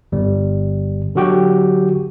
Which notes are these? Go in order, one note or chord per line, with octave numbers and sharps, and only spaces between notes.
G1 G3
D3 F#3 F#4 G4 G5